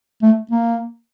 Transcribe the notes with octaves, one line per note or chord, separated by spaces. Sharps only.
A3
A#3